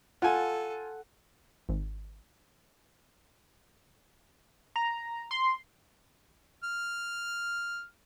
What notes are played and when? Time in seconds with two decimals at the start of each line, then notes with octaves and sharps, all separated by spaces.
0.22 F4 A4 F#5 G#5
1.69 G#1
4.76 A#5
5.31 C6
6.64 F6